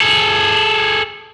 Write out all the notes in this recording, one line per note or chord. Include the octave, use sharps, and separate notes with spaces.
G#4 A4